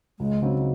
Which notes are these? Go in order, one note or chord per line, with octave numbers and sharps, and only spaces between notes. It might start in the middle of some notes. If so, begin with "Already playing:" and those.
C#2 G#3
C#3 F#3 C4 D#4